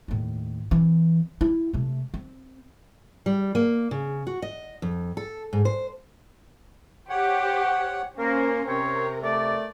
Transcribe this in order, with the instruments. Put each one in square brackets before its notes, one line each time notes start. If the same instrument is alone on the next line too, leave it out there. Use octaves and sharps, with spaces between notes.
[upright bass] D#2 A2
E3 C4
E4
C3 A3
C4
[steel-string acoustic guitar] G3
A#3
C#3
F#4
D#5
F2
A4
G#2
C5
[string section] G4 C5 [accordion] C#5 F#5
[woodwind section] A#3 [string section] C#4 C5 [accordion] A#4
[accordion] C3 [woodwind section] C4 C5 C#5 [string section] A#4
[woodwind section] A3 D5